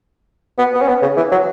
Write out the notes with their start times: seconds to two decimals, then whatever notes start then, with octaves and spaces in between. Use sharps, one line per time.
0.58 B3
0.74 B3
0.82 C#4
0.88 B3
1.02 C#3
1.17 E3
1.31 F#3